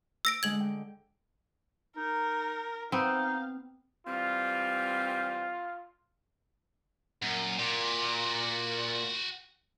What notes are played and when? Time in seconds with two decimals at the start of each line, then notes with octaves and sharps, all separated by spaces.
0.25 E6 A#6 D7
0.43 D3 G#3 G#6 F#7
0.60 G5
1.97 D#4 A#4
2.92 B3 C4 D#4 F5
4.07 E3 G3 C4 F4
7.22 F#2 A#2
7.59 A#2 F#4 G4